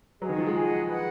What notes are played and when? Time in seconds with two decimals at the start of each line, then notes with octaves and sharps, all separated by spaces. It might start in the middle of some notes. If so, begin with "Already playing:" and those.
0.21 F#3 G#4 D#5 F#5
0.29 D#3
0.38 F3
0.46 G#3
0.54 G#4 D#5 F#5
0.88 B4 D#5 F#5